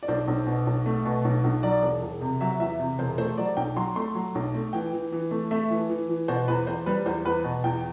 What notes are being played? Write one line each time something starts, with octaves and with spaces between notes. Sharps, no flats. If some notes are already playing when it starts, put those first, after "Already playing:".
D5
B1 C5
B1
B2
B1
A3
B2
B1
B1
F#3 D5
E1
E1
C3
F#3 E5
E2 E5
C3
E1 C5
A3 C5
F#3 D5
B1 G5
F#3 C6
A3 C6
F#3
B1
A3
E3 G5
E3
E3
A3
A3 E5
E3
E3
E3
B2 C5
E2 B4
E2 C5
G3 B4
E2 C5
E2 B4
B2
E2 G5